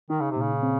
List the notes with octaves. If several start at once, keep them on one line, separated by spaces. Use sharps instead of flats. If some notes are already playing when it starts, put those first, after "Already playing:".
D#3 D#4
C#3
C3
A#2 C#3
C4